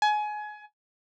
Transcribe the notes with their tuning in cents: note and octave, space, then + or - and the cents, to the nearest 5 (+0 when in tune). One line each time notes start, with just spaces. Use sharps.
G#5 +25